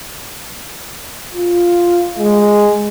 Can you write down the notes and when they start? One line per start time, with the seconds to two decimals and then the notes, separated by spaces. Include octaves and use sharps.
1.34 F4
2.18 G#3